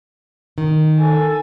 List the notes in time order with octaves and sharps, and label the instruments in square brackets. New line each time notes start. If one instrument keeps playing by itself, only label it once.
[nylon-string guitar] D#3
[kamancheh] A4 G#5